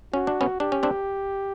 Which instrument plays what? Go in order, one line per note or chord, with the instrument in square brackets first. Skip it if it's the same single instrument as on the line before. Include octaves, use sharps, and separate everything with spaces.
[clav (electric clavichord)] C#4 [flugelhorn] F#4
[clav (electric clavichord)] D4
B3 C#4
[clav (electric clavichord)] D4 [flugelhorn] G4
[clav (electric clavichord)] C#4
C4 D4